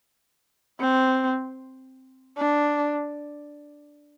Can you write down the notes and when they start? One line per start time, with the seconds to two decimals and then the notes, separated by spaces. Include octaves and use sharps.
0.80 C4
2.37 D4